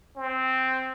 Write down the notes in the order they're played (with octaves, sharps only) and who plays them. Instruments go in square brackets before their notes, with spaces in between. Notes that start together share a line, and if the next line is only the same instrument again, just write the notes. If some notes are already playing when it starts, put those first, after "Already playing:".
[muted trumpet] C4